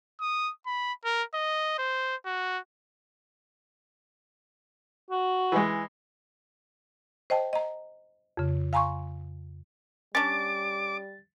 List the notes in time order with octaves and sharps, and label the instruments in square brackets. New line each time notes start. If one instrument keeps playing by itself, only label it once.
[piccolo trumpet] D#6
B5
A#4
D#5
C5
F#4
[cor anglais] F#4
[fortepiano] E3 G#3
[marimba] C5 D#5 G5 A5
D#5 A#5
F2 C#3
F5 G#5 A#5 C6 C#6
[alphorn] G3 [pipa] C#4 D4 [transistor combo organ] D6 [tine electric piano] A6